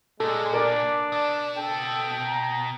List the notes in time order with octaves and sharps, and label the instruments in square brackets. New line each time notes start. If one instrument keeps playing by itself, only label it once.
[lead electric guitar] A#2 [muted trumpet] G#3 [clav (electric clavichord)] A4
[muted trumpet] D4 [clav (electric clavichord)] A#4 G#5 [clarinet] D5
[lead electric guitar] B2 A5
[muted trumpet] A4 [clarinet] G5
[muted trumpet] A#5